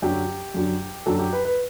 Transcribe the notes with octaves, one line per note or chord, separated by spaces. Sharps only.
F#2 D3 F#3 G4
F#2 D3 F#3
F#2 D3 F#3 A4
G4
B4
B4